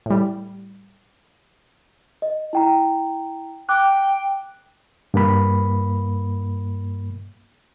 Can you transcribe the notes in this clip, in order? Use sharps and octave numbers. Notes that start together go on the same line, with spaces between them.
A2 G3
D#5
E4 G5 A#5
G5 D6 F#6
G2 A#3 B5